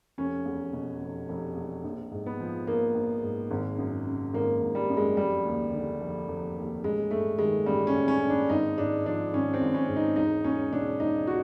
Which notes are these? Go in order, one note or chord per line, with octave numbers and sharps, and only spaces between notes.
F1 C#4
E2
B2
F1
F1
E2
A#1
G#2
B3
F3
A#1 A#3
A#1
G#2
G#1
F#2
C#3
G#1 A#3
G#1
G3
F#2
G#3
F1 G3
D#2
D3
F1
F1
D#2
A1 G#3
G2 A3
D#3 G#3
A1 G3
C#4
A1
C#4
G2
D4
G#1 D#4
G#2 D4
F3 D4
G#1 C#4
C4
G#1
C#4
G#2
D#4
E1 D#4
E2 C#4
B2 D4
E1 D#4
F#4